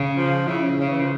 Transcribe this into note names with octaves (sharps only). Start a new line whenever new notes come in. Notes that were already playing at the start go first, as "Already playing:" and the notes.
Already playing: C#3
F3
C#3 E4
C#4
C#3 C#4
E3
F3